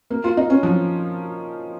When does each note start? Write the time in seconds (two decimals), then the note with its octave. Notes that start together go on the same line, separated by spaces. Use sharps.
0.10 A#3
0.24 F4
0.37 D#4
0.50 C#4
0.63 F3